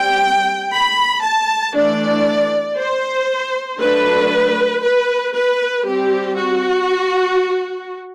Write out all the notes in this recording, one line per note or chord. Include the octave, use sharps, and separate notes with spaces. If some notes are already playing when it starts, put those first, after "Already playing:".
Already playing: G3 C4 G5
B5
A5
E3 A3 D4 D5
C5
D3 F#3 A3 D4 B4
B4
B4
G3 C4 G4
F#4